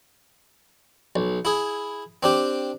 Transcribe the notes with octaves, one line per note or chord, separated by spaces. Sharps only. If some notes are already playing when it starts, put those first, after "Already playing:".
B1
E4 G#4
C4 D4 G4